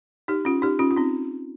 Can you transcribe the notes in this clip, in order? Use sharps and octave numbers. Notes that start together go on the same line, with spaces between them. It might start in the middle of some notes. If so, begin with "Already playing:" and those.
D#4 G4
C#4 F4
D#4 G4
C#4 F4
F4
C4 D#4